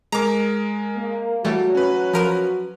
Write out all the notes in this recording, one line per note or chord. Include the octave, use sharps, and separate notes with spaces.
G#3 A#4 A#5 D6
A#3
E3 F#3 G3 A3 F#4
C#4 B4
F3 A#4 D#7